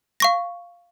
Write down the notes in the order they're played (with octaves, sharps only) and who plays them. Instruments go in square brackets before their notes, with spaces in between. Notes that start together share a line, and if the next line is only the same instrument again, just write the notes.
[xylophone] F5 C#6 A#6